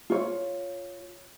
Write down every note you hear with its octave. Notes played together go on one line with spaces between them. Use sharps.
F4 C#5